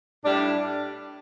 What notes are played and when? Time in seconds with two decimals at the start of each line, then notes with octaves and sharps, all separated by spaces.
0.23 A2 G3 D4